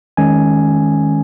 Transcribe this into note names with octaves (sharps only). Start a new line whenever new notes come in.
D#3 G#3 C#4 G#5